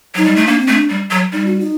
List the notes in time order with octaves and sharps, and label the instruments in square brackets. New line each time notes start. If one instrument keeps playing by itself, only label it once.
[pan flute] F#3 [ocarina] D#4
[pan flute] G3
A3
[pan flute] A#3 [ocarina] D4
[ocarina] C4
[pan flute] A3
[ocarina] D4
[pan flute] G3
F#3
[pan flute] G3 [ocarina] D#4
[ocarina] F#4
D#4